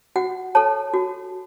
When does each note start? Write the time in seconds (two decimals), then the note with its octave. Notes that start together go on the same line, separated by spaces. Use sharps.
0.16 F#4 F#5
0.55 A4 C#5 A5
0.94 F#4